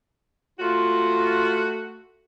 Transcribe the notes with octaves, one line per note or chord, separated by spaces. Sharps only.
A3 F4 F#4